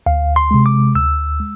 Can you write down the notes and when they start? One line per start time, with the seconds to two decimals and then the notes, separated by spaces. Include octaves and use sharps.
0.06 D2 F5
0.36 C6
0.51 C3 G#3
0.66 D6
0.95 D2 E6
1.40 G#3